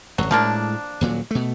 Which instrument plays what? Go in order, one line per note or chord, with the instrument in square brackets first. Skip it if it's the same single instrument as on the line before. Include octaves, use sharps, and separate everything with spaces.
[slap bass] D#1 G#1 [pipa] F#3
[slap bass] A2 G#3 [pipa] F3 A#3 D4
[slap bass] D#1 A#2 F#3
B2 A3